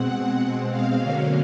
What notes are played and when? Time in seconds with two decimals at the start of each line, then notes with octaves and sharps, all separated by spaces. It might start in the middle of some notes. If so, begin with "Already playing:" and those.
Already playing: B2 G#3 C4 F#5
0.70 F5
0.99 D3 F#3 A#3 C#4